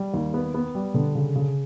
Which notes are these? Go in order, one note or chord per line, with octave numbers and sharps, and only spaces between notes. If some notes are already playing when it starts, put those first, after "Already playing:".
Already playing: G3
D#2
B3
B3
G3
D3
C#3
C#3